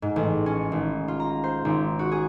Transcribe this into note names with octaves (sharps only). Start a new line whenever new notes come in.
G#2
A1
C#4
G#1
F4
A#5
C5
G#1
F#4
G#4